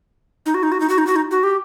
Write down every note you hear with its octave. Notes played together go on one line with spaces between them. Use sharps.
D#4
F#4
D#4
F#4
D#4
F#4
D#4
F#4
D#4
F#4
G4